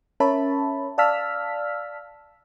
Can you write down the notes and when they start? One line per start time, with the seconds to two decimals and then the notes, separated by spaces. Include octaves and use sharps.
0.20 C#4 A#4 C#5 E5 A5 B5
0.98 D5 F5 A5 E6 F6 B6